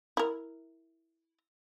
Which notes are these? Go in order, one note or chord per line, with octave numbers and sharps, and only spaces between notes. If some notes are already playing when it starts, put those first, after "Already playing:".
E4 A#4